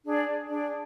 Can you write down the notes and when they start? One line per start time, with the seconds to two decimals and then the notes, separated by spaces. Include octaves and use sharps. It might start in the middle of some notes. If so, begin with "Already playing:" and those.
0.05 D4 G#4 D5
0.49 D4 G#4 D5